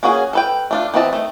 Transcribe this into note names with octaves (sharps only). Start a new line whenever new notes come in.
A#3 C#4 F#4 G#4
A4 B4 G5
A3 D4 F4
E3 B3 C4 D#5 A5
D#3 A3